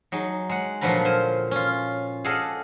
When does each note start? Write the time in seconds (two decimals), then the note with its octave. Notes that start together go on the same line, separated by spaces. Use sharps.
0.12 F#3 D#4 G#4
0.49 G#3 F#5
0.81 A#2 D3 F3 F#3 B4 A#5
1.05 C5 F5 G#5
1.51 C#4 F4
2.25 G#4 A4 D5 D#5 F5 F#5